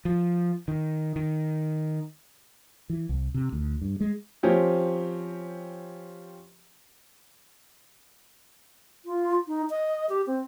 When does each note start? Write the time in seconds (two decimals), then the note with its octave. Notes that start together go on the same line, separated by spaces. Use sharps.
0.05 F3
0.68 D#3
1.16 D#3
2.90 E3
3.09 C2
3.34 C3
3.53 D2
3.82 G2
4.00 G#3
4.43 F3 C4 C#4 G4
9.05 F4
9.48 D#4
9.70 D#5
10.09 G4
10.27 C4